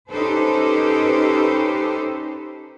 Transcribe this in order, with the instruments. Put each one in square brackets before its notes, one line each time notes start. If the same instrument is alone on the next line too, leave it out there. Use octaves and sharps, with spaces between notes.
[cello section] C#4 D#4 G4 A4 B4 C5